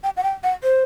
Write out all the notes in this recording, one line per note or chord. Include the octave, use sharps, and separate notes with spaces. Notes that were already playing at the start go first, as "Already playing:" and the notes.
G5
F#5
G5
F#5
C5